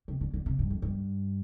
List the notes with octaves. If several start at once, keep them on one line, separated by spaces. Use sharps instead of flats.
C3
D3
D3
C3
G2
F2
G2